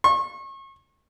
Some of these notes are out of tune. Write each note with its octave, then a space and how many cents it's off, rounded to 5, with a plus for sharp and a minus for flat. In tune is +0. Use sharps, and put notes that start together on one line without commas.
C#6 -35